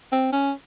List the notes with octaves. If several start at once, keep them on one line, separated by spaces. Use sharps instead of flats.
C4
C#4